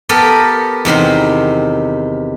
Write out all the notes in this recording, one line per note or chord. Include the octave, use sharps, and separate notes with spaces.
B3 G4 A4 A#4
E2 C3 D#3 C6